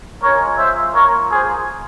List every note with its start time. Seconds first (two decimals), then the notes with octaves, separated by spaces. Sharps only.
0.22 G#3 C#4 F4 A#4 C#5
0.58 C5 E5
0.94 A#3 F4 A#4 C#5
1.31 G#4 C5